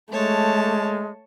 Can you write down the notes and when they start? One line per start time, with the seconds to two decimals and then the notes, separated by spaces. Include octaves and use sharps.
0.12 G#3 A3 C#5 A5